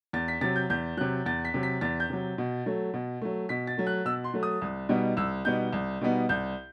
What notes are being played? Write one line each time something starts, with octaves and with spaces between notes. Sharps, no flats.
E2 A6
B6
C3 F#3 A6
G6
E2 G6
C3 F#3 F#6
E2 A6
B6
C3 F#3
B6
E2 A6
G6
C3 F#3
B2
F#3 A3
B2
F#3 A3
B2 B6
A6
F#3 A3
F#6
B2 E6
C6
F#3 A3
D#6
C2
B2 G3 B3 D#4
C2 E6
B2 G3 B3 D#4 G6
C2
B2 G3 B3 D#4
C2 G6